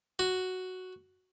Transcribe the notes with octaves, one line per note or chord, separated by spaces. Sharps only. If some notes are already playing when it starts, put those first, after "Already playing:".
F#4